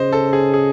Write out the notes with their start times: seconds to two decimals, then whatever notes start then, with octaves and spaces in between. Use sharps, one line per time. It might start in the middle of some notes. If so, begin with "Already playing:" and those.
Already playing: C#3 C5 D#5
0.13 A4
0.33 G#4
0.54 G#4